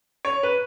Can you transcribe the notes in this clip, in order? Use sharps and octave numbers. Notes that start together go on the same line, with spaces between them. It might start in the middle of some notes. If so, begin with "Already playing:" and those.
C#5
B4